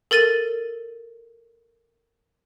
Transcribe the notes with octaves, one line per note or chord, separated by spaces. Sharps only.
A4 A#4 A6 D#7 F#7